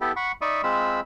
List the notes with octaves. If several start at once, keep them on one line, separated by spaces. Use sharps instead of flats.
B3 E4 G4 A4
F#5 B5 C#6
D#4 D5 E5 B5 C#6 D#6
G#3 C4 F4 B5 E6